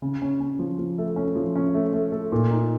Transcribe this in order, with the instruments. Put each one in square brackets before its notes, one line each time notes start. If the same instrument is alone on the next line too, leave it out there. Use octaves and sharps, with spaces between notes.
[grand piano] C#3
C#4
C#4
F3
F3
A3
C#4
F3
C#4
A3
A3
A3
A#2
D#4